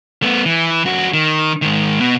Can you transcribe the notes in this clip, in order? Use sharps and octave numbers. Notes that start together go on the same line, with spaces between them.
A3 B3
E3
F2 F#4
D#3
G#2 D#3
B2